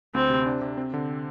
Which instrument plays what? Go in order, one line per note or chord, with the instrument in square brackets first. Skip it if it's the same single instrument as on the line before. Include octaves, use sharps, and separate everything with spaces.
[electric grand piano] D2 [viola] C4
[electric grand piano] C3
D4
C3
C4
D3